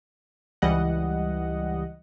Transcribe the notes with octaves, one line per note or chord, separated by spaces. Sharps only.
C#2 E3 G3 D#5 F#5